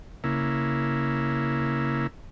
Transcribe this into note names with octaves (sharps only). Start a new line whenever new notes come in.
C#3 A#3 E4